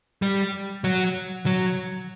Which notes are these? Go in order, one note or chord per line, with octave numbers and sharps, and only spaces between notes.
G3
F#3
F#3